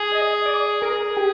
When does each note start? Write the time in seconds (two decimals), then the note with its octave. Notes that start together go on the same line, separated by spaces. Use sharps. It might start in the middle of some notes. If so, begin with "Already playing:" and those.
Already playing: G#4
0.11 D#5
0.46 D5
0.82 G#4 A#4
1.17 G4